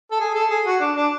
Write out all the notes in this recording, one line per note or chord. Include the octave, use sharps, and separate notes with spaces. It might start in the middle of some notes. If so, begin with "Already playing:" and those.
A4
G#4
A4
G#4
F#4
D4
D4